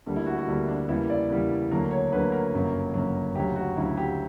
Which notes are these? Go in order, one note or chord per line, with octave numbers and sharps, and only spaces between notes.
D2 D3 G3 A#3
E4
F#4
F#4
D2 D3 G3 A#3 E4
D4
E2 C#3 E3 G3 A#3 E4
D5
E2 C#3 E3 G3 A#3
D2 D3 F#3 A#3 A#4
C#5
D2 D3 F#3 A#3 B4
A#4
G1 F#2 C#3 F#3 A#3
G1 F#2 C#3 F#3 A#3
D2 C#3 F#3 G4
F#4
D2 C#3 F#3 E4
G4